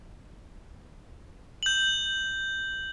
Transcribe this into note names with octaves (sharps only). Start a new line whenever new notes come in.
G6 F#7